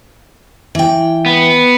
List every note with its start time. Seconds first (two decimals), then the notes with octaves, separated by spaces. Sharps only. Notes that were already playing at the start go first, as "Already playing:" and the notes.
0.75 E3 G5
1.26 B3